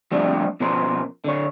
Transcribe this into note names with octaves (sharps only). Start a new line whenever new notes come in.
F3 G3 A3 C4 D4 G4
B2 F3 C#4 A#4 C5
D3 C#5